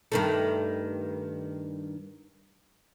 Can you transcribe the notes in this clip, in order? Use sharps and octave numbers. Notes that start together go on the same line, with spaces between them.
G2 D#3 A3